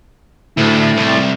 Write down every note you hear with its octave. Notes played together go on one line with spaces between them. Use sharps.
D2 A3 E4
C2